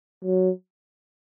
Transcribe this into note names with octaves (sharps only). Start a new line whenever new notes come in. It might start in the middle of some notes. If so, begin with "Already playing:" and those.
F#3